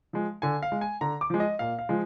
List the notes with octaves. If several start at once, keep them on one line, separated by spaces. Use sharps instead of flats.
F3 G#3
D3 G#5
F5
G#3
G#5
D3 A#5
D6
F3 G#3
D#5
A#2 F5
F5
F3 G#3